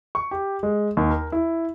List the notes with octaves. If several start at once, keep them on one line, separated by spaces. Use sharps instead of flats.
C#6
G4
G#3
D#2
A#4
E4